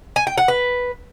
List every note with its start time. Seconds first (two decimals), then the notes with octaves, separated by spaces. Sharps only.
0.16 G#5
0.27 G5
0.38 F#5
0.48 B4